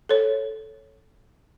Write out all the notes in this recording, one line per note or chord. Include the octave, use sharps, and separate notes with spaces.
A4 C#5